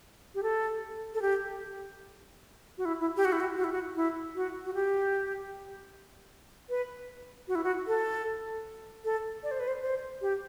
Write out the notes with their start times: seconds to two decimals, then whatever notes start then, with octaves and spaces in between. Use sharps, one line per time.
0.35 G4
0.43 A4
1.14 A4
1.22 G4
2.78 F#4
2.85 E4
3.00 E4
3.17 G4
3.25 F#4
3.32 E4
3.40 F#4
3.57 F#4
3.64 E4
3.72 F#4
3.96 E4
4.35 F#4
4.65 F#4
4.74 G4
6.69 B4
7.48 F#4
7.55 E4
7.64 F#4
7.87 A4
9.05 A4
9.43 D5
9.51 C5
9.60 B4
9.68 C5
9.82 C5
10.21 G4